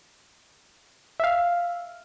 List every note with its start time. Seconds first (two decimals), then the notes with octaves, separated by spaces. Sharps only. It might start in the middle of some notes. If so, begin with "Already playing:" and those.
1.20 E5 F5